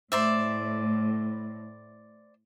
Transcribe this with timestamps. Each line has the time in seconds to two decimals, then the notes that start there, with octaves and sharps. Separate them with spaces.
0.12 A2 C5 D5 E5